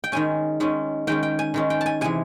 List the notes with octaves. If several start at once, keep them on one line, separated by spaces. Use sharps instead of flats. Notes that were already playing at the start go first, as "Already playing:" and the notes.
G5
D#3 G#3 C#4 G#5
D#3 G#3 C#4
D#3 G#3 C#4 G5
G5
G#5
D#3 G#3 C#4
G5
A5
G#5
C3 E3 G#3 G#5